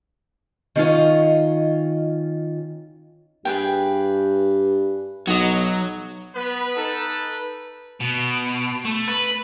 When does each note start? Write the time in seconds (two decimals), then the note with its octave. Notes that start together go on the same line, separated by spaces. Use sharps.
0.76 D#3 C#4 F4 D#5
3.45 G2 G#4 B4 G5
5.27 B1 F#3 D#5 D#6
6.36 B3 B4
6.76 D#4 A4
8.00 B2
8.85 A3
9.08 B4